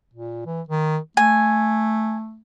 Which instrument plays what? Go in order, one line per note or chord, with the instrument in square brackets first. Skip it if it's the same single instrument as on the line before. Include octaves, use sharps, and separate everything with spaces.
[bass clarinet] A#2
E3
D#3
[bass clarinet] A3 [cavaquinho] G#5